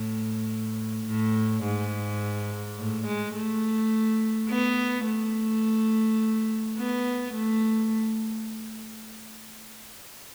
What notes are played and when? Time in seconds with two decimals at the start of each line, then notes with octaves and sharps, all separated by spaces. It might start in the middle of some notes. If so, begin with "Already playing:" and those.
Already playing: A2
1.07 A2
1.65 G#2
2.78 A2
3.07 G#3
3.35 A3
4.50 B3
5.07 A3
6.78 B3
7.35 A3